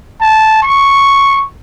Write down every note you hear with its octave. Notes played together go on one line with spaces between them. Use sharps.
A5
C#6